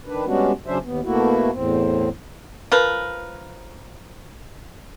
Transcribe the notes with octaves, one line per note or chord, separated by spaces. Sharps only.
D#3 D4 B4
G3 G#3 B3 C#4 D4 F#4
C#3 F#3 C#4 D4 C5 E5
D#2 B3
B2 A3 A#3 E4 F#4
E2 A2 C4
F3 A#4 B4